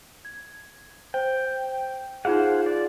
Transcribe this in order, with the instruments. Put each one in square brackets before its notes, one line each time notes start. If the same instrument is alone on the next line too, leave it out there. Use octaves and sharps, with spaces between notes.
[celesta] G#6
[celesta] C5 [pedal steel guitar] G5
[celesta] D#4 F4 G#4 [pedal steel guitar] C5 F5 F#5
[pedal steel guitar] D5